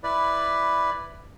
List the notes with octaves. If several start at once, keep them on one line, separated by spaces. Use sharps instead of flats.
E4 B4 D5